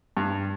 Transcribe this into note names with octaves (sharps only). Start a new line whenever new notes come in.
G2